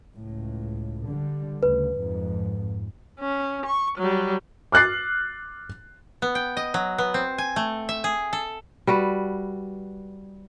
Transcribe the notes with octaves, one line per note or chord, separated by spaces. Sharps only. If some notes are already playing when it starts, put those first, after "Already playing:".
C#2 A2
D3 G3
D2 C#3 B4
F2 G#2
C#4
C#6
F#3 G3
D6 F6 F#6 A6 C7
B3
G5
D#5
F#3
B3
C4
G#5
A3
E5
G#4
A4
G3 F#4 B4